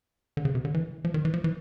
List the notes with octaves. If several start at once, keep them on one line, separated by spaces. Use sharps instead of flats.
D3
C#3
C3
D3
E3
F3
D#3
E3
F3
E3